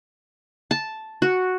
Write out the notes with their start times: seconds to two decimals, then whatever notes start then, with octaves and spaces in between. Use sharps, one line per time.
0.71 A5
1.22 F#4